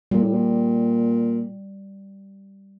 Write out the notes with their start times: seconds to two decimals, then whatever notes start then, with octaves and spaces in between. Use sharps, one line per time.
0.11 A#2 G3
0.23 A2
0.33 A#2